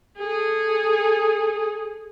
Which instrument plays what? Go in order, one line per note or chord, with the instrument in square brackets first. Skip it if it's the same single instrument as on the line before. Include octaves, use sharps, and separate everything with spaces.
[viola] G#4 A4